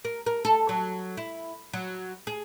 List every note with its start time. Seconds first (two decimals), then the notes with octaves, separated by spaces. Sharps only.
0.05 A#4
0.26 A#4
0.45 A4
0.69 F#3
1.17 E4
1.73 F#3
2.27 G#4